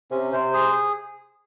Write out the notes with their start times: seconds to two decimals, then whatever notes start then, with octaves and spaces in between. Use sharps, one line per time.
0.11 C3 C#4
0.32 C3 C5
0.54 G#4